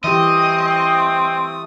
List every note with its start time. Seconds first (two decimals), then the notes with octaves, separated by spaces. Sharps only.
0.04 E3 A3 C4 G4 D#5 D#6